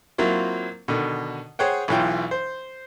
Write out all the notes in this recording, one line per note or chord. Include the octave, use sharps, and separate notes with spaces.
F#3 A#3 C4 E4 F4
B2 D3 D#3
G#4 C5 C#5 F#5 G5
B1 B2 E3 F4 G5
C5